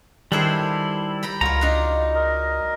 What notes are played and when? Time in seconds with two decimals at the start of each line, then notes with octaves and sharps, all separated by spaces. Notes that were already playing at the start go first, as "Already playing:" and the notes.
0.32 D#3 G3 D4 E4 G#4 A4 C5
1.23 G5 A#5 B5
1.41 C#2 F#3 F4 A#4 A#5
1.61 D4 D#4
2.15 A#4 D#5